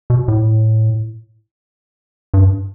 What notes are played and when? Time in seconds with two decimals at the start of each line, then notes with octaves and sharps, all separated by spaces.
0.10 B2
0.28 A2
2.34 G2